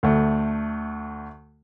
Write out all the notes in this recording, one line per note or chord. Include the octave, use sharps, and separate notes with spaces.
D2 A3